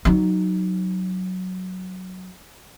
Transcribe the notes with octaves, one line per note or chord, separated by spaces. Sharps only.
F#3 D#4